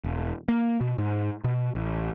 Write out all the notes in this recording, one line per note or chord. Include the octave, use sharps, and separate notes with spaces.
E1
A#3
B2
G#2
B2
A1